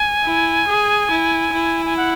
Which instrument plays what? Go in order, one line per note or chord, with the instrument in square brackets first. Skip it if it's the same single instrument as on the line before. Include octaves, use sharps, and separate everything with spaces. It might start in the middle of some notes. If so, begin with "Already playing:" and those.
Already playing: [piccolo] G#5
[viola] E4
G#4
E4
E4
[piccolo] G#5
F#5